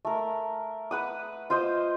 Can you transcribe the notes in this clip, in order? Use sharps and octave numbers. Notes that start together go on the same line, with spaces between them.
A3 A#4
B4 F#5 D#6
F4 C5 D#5 D#6